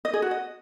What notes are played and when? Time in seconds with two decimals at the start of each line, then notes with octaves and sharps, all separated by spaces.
0.05 D#5
0.14 G#4
0.22 F#4
0.31 D#5